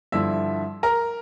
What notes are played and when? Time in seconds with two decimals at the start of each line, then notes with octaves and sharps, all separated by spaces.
0.12 G2 D3 F3 E4 E5
0.83 A#4 A#5